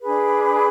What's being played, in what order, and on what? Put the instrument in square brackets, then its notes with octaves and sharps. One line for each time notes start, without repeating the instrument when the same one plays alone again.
[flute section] D4 G#4 B4